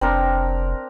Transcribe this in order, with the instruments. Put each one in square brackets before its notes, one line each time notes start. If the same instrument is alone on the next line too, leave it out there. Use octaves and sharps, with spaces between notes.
[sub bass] F1 [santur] C4 D4 A#4